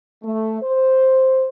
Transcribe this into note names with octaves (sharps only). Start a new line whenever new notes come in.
A3
C5